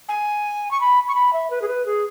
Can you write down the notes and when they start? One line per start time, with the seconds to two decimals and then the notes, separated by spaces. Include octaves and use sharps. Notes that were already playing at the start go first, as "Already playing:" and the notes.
0.08 G#5
0.71 C#6
0.81 B5
1.08 C#6
1.15 B5
1.33 E5
1.50 B4
1.62 G#4
1.68 B4
1.86 G#4